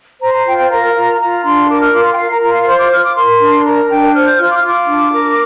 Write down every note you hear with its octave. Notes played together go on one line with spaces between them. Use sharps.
C5 A#5
A#5
F4 G5
G5
A#4 A#5
F4
F4 A#5
D4 C6
A#4 D6
F6
F4 D6
C6
G5
A#4 F5
A#5
F4 A#5
F5
C5 C6
D6
F4 F6
D6
A#4 C6
D4
A#4 A#5
D4 G5
C5 F6
G6
F4 F6
D6
F6
F4 D6
D4
A#4